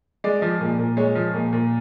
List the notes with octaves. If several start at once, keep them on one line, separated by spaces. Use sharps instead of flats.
G#3 D5
F3
A#2
A#2
G#3 C#5
F3
A#2
A#2